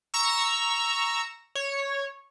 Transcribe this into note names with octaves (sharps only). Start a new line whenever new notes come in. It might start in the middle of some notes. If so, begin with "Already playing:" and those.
A#5 C#6 E6
C#5